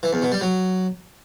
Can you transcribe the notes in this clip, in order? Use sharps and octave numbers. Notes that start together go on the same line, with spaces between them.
E3
E2
B2
G3
F#3